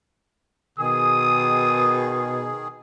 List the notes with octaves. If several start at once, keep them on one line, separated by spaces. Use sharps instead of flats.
B2 D#3 G#4 D#6